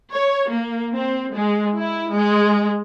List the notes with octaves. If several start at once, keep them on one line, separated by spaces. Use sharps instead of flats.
C#5
A#3
C4
G#3
E4
G#3